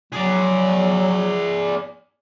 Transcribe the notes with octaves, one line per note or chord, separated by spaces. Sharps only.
F#3 G#4 D5